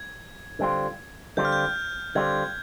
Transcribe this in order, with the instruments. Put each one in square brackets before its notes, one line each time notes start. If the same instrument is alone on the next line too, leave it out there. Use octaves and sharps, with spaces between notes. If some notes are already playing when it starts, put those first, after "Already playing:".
Already playing: [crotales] G#6
[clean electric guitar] D3 G3 C4 F4
[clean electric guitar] D3 G3 C4 F4 [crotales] G6
[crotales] F6
G6
[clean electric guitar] D3 G3 C4 F4 [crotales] G#6